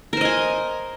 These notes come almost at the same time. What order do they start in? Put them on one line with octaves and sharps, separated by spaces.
A#4 C5 D#5 G#5